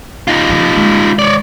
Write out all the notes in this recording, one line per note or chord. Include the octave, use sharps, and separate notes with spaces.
D#4 F4
C#3 F3
D#3 G#3
C#5 D5